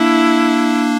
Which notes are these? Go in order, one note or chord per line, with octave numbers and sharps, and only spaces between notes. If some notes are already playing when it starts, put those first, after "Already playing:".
Already playing: A#3 D4 E4